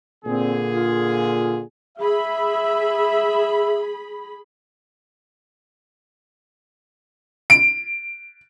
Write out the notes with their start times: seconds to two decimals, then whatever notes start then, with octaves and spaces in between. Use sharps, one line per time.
0.25 A#2 D3 C4 G#4
0.74 F4
1.98 G#4 E5 B5
7.50 D7